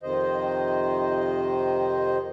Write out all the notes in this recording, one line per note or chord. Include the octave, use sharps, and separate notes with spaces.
F2 C3 D#3 C5 D#5